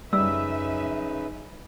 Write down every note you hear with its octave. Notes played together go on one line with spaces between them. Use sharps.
F#2 C#3 G3 D#4 B4 E5 E6